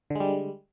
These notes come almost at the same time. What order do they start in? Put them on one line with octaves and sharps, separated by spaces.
D3 G#3 G3